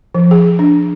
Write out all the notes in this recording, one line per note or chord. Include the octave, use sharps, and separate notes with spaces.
F3
G#4
D4